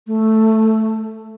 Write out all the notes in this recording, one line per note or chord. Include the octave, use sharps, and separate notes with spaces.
A3